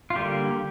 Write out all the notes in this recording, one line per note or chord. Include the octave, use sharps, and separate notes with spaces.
F4
D3 G3 A#3 G4